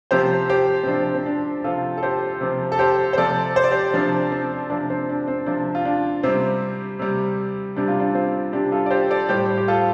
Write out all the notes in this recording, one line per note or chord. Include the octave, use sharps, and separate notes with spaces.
C3 F3 G4 C5
G4 C5
C4
C3 F3 D4
C4
D4
C3 F3 F4 A4
A4
G4 C5
C3 F3
A4
G4 C5
C5
C3 F3 A4 D5
C5
D5
G4 C5
C3 F3 D4
C4
C3 F3 D4
C4
D4
C4
C3 F3 D4
F4
D4
C3 G3 C4
C3 G3
C3 G3 D4
F4
D4
C4 F4
C3 G3 D4 G4
F4 A4
D5
G4 C5
A4 D5
A2 G3 G4 C5
G4
F4 A4